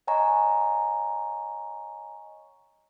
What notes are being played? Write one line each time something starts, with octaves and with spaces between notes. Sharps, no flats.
C#5 D#5 F#5 G#5 A#5 C#6